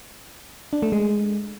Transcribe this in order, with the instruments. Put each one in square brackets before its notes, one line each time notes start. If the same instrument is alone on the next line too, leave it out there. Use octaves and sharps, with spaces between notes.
[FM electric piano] D4
A3
G#3